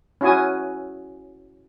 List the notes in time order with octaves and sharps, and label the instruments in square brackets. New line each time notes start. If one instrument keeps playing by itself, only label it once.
[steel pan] C#4 E4 F#4 G#5 D#6